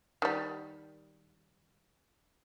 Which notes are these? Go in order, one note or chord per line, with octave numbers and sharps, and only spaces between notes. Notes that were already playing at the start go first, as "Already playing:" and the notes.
D#3 G3